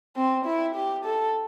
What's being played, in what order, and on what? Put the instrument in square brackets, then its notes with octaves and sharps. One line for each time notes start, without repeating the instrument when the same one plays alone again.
[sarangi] C4
E4
G4
A4